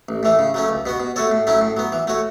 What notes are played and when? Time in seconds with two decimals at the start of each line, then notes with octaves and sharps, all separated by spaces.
0.09 A1
0.23 A2 E3 A3
0.39 C#3
0.54 F#3 A3 C#4
0.69 C#2
0.86 B2 B3 F#4
1.00 B2
1.16 A3 F#4 A4 C#5
1.31 A2
1.47 F#3 A3 C#4 E4
1.61 A2
1.77 F#3 B3
1.92 E3
2.07 A3 F#4 C#5